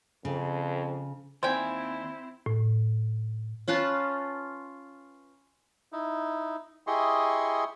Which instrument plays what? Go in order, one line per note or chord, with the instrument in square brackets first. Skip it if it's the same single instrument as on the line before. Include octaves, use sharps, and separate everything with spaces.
[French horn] F2 [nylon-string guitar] C#3
[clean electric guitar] D#2 D5 G#5 [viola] C4 E4 [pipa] C5 G5
[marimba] A2
[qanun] C#4 F4 B4 A5
[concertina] D#4 E4
E4 G4 G#4 D#5 C6 C#6